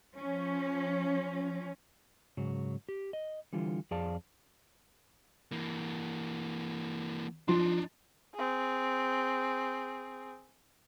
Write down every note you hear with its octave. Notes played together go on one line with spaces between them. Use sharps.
F3 C#4
G#2 C#3 F#3
G4
D#5
D3 E3 G3 F4
F2 G#4 D5 F5 A5
E3 A#3
F3 D4 D#4 C6
C4 G#4